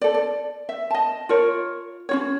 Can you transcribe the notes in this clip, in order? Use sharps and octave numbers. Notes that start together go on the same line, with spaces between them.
A4 D5
D5
E5
D#5 A5
F4 A#4 C#5
C#4 F4 C#5